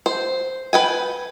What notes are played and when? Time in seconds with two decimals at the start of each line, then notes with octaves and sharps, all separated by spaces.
0.06 C5
0.73 B4 G5 G#5